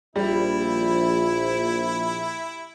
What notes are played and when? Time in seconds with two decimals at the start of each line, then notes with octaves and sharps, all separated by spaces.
0.16 A#1 G3 E4